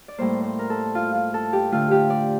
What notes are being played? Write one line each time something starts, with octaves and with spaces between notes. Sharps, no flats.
D5
A2 G3 A#3 C5
C5
A#4
A4
F4
F4
A4
G4
D3 A3 F4
G4
D5